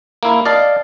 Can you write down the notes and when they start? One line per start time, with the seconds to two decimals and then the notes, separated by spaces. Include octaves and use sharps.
0.23 A#3 E4
0.45 D5 D#5 F5 A5